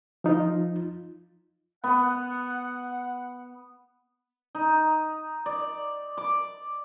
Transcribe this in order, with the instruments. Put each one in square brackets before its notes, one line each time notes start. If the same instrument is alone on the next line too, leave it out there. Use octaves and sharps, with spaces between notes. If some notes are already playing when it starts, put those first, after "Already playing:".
[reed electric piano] F3 D#4 F4
[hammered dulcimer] B3 [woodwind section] F#5
[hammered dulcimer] D#4
D5
D6